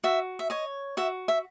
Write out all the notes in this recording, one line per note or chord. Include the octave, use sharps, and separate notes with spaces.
F#4 E5
E5
C#5 D#5
F#4 E5
E5